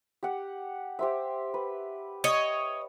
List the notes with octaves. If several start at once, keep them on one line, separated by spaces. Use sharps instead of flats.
G4 F#5
G4 C5 E5
B4
C#5 D#5